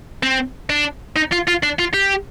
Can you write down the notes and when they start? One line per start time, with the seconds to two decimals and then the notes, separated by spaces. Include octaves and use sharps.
0.23 C4
0.70 D4
1.16 D#4
1.32 F4
1.47 F4
1.63 D4
1.79 F4
1.94 G4